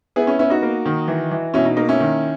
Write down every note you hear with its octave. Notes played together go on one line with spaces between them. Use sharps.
B3 E4 G#4
C#4 E4
B3 C#4 E4
D#4 F#4
A#3
D#3
E3
E3
B2 C#4 E4
D#4
A#3 D#4
C#4 E4
D#3